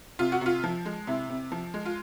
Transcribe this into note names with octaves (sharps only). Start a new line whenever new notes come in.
C3 F4
F#4
C3 F4
F3
G#3
C3 E4
C3
F3
G#3
F4